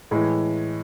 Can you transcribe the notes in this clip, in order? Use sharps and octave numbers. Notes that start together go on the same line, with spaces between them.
A2 E3 G#3